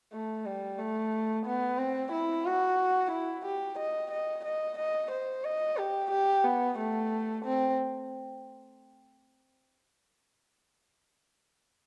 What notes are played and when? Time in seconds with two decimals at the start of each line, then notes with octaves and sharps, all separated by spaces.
0.12 A3
0.46 G3
0.78 A3
1.46 B3
1.78 C4
2.12 E4
2.45 F#4
3.11 E4
3.46 G4
3.79 D#5
4.11 D#5
4.45 D#5
4.78 D#5
5.11 C5
5.44 D#5
5.77 G4
6.11 G4
6.44 B3
6.78 A3
7.45 C4